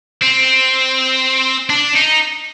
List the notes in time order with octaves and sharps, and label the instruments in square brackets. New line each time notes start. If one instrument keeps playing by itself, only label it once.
[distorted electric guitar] C4
D4
D#4